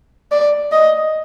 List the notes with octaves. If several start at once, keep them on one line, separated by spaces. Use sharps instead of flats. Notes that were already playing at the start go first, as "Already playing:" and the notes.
D5
D#5